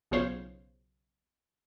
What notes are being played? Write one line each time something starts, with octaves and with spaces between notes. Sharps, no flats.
B1 C#3 F4 C5 C#5